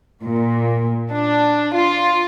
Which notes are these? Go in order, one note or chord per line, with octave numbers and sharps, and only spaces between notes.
A#2
D4
F4